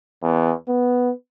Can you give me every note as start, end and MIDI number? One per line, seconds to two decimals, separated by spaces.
0.23 0.52 40
0.68 1.11 59